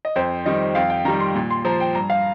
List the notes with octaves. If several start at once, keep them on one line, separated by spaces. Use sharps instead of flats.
D#5
F2 C5
D#3 G3 D#5
F2 F5
G5
D#3 G3 A#5
C6
A#2
C6
F3 A#5
G5
G2 A#5
F5